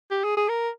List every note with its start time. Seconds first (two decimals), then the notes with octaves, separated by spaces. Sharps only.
0.11 G4
0.24 G#4
0.37 G#4
0.49 A#4